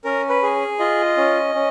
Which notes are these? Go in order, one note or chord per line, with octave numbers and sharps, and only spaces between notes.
C#4 A#4
B4
G#4
F4 D#5
C#4
C#4